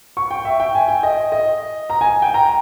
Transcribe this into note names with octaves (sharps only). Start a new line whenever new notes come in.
C#6
G5
E5
G5
G#5
G5
D#5
D#5
A#5
G#5
G5
A#5